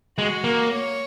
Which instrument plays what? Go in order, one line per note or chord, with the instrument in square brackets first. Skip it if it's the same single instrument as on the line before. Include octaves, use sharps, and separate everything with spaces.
[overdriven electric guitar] G#3 [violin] F#4
[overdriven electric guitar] A#3
[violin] C#5